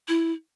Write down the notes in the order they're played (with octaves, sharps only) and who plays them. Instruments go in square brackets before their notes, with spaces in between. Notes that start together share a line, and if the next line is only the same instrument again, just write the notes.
[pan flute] E4